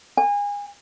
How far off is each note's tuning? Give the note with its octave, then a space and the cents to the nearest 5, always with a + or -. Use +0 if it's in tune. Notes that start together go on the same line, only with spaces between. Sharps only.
G#5 -30